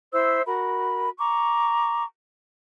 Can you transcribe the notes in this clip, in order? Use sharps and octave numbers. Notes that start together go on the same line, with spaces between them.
E4 C5 E5 E6
F#4 A#4 B5
A#5 C#6 D6